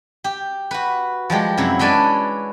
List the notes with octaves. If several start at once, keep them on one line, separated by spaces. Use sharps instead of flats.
G4
F#4 B4
F3 G3 G#3 G4
F#2 C3 F#3 E4
G#3 C#4 D4 B4 D5